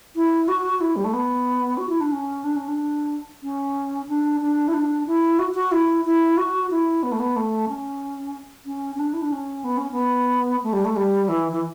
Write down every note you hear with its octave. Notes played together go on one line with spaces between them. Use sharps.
E4
F#4
E4
G3
A3
B3
F#4
E4
D4
C#4
D4
C#4
D4
C#4
D4
D4
E4
D4
E4
F#4
F#4
E4
E4
F#4
E4
B3
A3
B3
A3
C#4
C#4
C#4
D4
E4
D4
C#4
B3
C#4
B3
A3
G3
A3
G3
E3
E3